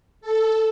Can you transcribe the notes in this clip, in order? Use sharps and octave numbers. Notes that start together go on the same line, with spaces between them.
A4